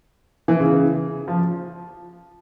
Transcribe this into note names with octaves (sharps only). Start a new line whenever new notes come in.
E3
C#3
F3